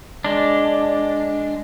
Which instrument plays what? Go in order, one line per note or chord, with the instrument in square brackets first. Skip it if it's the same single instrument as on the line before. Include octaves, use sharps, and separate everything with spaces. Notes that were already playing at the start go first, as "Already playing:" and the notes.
[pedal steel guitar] G#3 D4